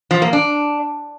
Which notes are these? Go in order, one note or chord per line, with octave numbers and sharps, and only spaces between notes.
F3
A#3
D4